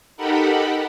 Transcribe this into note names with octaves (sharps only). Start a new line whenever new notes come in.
D#4 G4 A4 A#4 F#5 B5